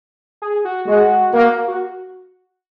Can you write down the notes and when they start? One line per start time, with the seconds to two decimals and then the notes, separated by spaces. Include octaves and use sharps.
0.42 G#4
0.65 F#4
0.87 G#3 F#4
1.32 A#3
1.68 F#4